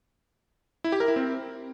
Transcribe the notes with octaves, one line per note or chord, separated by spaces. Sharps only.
E4
G4
A#4
E4
C4